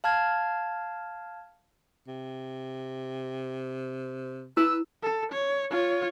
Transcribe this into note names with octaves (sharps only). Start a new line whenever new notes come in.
F5 A5 F6 G#6
C3
E4 B4 E6
A4
C#5
F4 C#5